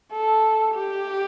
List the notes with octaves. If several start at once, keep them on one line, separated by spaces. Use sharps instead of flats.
A4
G4